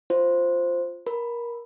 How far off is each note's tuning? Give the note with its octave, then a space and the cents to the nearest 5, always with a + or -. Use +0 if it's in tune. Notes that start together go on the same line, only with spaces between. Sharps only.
F4 +0 C5 +0
A#4 +20 B5 +0